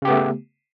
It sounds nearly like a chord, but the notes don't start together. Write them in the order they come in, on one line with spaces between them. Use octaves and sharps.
C#3 G4 B3 A3